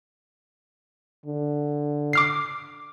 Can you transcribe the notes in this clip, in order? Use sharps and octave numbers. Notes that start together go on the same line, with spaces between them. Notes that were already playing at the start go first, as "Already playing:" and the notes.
D3
D6 F6 C7